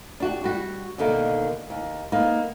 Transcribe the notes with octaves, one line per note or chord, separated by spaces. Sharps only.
D4 F#4 G4
G3 F#4
B2 D3 D#3 A#3
D#2
A#3 B3 D#4